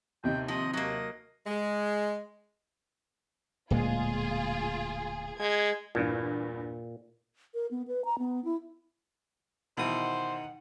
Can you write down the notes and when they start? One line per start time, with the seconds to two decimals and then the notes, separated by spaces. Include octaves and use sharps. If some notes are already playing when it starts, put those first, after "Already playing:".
0.24 D#2 C3 D#4 G5
0.48 F3 D#5
0.73 F#3 A#3 D#5
1.46 G#3
3.70 D1 A#2 G#3 F4 G#4
5.40 G#3 G#6
5.95 E2 G2 A#2
7.54 A#4
7.71 B3
7.88 B4
8.05 A#5
8.19 B3
8.45 E4
9.78 B2 D#3 E3 C5 F#5 D#6